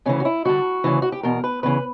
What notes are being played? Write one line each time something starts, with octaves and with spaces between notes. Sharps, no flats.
D2 C#3 E3 C#4
F#4
E4
G2 D3 F#4
D2 C#3 E3
F#4
G4
E2 B2 A#4
B4
E2 C#3 E3 B4